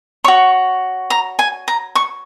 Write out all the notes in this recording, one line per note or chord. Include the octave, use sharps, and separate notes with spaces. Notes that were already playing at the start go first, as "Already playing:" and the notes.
F#4 C#5 C#6
A#5
G#5
A#5
C#6